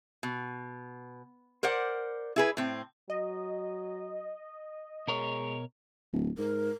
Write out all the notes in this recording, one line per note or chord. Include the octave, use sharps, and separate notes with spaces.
B2
A#4 C5 D5 F#5
E4 G#4 B4
A2 C4
F#3 D#5
B2 G#3 A#4 C#5
D1
G#2 A#4